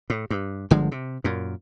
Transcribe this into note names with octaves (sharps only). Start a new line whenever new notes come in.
A2
G2
G1 D3 F3 G#3
C3
F#2 A#2